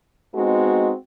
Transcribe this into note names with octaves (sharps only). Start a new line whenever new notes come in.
G#3 B3 C4 D#4 F#4